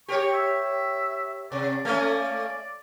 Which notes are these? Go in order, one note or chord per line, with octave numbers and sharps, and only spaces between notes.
G4 A#4 C#5 C#6
E5
C3 D5
A3 A#3 C#4